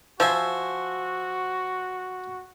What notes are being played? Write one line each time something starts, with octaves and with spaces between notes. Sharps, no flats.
F3 F#4 C5 E5 G#5